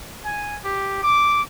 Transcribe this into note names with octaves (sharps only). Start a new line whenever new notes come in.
G#5
G4
D6